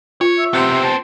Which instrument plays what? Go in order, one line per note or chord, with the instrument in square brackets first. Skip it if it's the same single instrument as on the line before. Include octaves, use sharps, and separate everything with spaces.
[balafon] F4 [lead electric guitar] C#5
[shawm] E5
[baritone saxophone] C3 [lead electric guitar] B3 C4
[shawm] A5